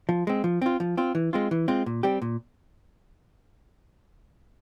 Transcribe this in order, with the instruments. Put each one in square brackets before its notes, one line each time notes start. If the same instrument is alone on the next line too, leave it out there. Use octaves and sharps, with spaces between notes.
[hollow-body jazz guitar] F3
G#3 C4
F3
C4 F4
F3
C4 F4
E3
G#3 C4 F4
E3
G#3 C4 F4
A#2
G3 C4 G4
A#2